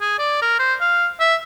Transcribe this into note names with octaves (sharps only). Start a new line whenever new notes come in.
G#4
D5
A#4
C5
F5
E5